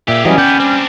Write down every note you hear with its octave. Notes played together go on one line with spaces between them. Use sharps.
A#2 G4 G#4 E5
E3 F#3 G3 C#4 D#5
D#2 B3 D5 G5
G3 C4 D4